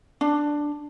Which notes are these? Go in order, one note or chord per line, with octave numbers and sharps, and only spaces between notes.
D4